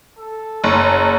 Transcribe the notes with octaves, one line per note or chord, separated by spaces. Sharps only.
A4
F#1 C#5